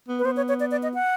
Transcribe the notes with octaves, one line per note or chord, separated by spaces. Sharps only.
B3
B4
B3 C5
C#5
C#5
D5
D5
D#5
F#5